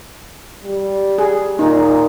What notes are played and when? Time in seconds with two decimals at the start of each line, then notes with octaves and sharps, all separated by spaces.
0.65 G3
1.18 G#4
1.59 A#2 D#4